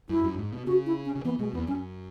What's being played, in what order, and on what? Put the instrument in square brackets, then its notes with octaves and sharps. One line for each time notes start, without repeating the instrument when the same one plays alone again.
[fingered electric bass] F#2 [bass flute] E4
[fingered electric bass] F#2
G#2
B2
[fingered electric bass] C#3 [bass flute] F#4
[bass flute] E4
C#4
[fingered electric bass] C#3
[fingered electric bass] E3 [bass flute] B3
[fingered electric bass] B2 [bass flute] G#3
[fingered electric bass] E2 [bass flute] B3
[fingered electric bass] F#2 [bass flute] C#4